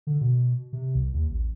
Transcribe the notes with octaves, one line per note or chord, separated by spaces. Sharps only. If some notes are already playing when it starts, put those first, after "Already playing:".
D3
B2
C3
C2
D#2
A1